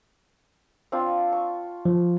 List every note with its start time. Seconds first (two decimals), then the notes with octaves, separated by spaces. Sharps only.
0.92 C4 D4 F4
1.33 C#6
1.85 F3